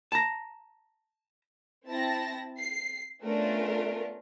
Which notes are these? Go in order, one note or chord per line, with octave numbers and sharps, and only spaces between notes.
A5 A#5
C4 E4 A5 A#6
C7
A3 B3 C#4 D4 F4 A#4